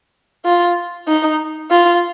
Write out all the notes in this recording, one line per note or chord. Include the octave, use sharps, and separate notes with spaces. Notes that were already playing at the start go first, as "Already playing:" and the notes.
F4
D#4
F4